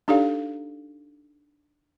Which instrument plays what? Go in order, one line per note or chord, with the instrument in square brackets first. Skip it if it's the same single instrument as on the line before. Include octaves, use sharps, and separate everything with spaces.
[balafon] D4 D#4 G4 A4 D5 F5